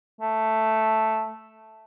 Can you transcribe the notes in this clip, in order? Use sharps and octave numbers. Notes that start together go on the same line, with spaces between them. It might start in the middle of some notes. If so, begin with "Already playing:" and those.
A3